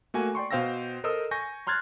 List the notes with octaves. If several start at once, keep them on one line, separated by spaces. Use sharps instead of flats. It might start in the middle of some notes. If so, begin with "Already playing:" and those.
A3 A#3 F#4 G#5
D5 G5 C6 C#6
B2 C5 F5 G5 E6 A#6
A4 A#4 C5 D#5 D#6 E6
G#5 C#6 G6 A#6
A#5 C6 F6 F#6 G#6 A6